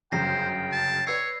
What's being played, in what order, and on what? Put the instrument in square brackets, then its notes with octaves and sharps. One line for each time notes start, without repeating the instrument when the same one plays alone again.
[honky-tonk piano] G1 F#2 C#3 [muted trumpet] C5 [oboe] G5 [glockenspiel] A#6 C7
[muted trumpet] A5
[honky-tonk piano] B4 D5 [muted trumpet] C#5 [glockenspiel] E6 C7